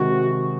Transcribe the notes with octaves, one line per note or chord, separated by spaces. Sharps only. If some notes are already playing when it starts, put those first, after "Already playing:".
Already playing: C3 D#3 G#3 D#4 F#4